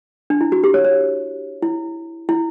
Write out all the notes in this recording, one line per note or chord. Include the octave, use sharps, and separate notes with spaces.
D4
E4
F#4
G4
C#5
C#5
E4
E4